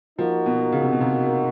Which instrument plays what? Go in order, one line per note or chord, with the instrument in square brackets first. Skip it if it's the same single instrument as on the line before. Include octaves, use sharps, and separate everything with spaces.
[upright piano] F3 [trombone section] A#3 D#4 F#4 A#4
[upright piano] B2
C#3
C3
B2
C3